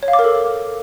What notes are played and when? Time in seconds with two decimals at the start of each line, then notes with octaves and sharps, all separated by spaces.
0.03 C#5
0.08 F5
0.13 D6
0.19 A#4
0.24 A4